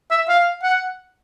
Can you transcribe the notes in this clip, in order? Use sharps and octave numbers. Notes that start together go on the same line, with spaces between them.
E5
F5
F#5